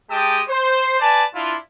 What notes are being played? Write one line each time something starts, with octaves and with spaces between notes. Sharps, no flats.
G#3 G4 G5 A5 D#6
C5
B4 D5 G#5 A5
D4 E4 F4